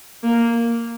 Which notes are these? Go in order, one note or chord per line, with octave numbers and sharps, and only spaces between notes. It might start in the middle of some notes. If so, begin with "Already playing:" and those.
A#3